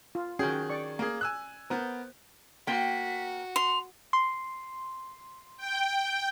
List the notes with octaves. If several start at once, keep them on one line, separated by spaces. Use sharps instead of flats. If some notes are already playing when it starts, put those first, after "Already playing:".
F4
D#3 C#4 F#4 G#4 G5
D5 C#6
A#3 G#4
G#5 E6 F#6
B3 A#4 C5
A#3 F#4 G5 B6
C6 F7
C6
G5